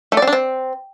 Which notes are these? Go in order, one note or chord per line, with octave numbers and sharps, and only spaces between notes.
A3
D5
C4
D4
C4